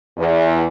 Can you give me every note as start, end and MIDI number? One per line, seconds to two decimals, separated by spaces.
0.17 0.65 40